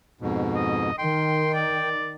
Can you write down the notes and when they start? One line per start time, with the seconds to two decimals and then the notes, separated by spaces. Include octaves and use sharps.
0.21 F2 G#2 B2
0.55 D#5
0.98 D#3 G5 C6
1.54 D5